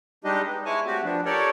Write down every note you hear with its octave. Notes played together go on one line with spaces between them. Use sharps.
G3 G#3 D4 D#4 G4 D#5
B3
G#3 E4 C#5 G#5 A5
A3 C4 F#4 G4
F3 B3 D4
G4 A4 A#4 C#5 D5